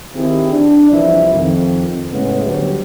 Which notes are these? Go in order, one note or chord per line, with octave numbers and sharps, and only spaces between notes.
D#3 C4 E4 G4 G#4
D4
C2 C3 E3 F3 E4
F2 D#3
A2 C#3 G#3 A3 B3
D2 F#3 G3 B3